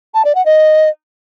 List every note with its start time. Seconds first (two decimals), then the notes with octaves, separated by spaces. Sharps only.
0.14 A5
0.25 D5
0.35 F#5
0.46 D#5